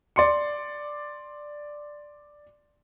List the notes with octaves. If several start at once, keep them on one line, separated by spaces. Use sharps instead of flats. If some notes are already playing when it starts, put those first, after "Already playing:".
D5 C6 C#7